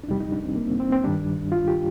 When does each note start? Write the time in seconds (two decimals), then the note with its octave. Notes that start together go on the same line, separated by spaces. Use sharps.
0.04 D4
0.08 F2 C3 G3 D#4
0.20 D#4
0.32 D4
0.44 C4
0.56 A#3
0.68 C4
0.80 C4
0.92 C4
1.04 G2 D#3 G3 D4
1.52 F4
1.68 G4